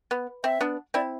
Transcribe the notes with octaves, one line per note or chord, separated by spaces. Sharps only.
B3
C4 E5
B3 D4
C4 E4 D5